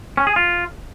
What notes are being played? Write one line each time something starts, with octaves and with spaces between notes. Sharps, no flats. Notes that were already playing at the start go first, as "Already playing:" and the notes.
C#4
G#4
F4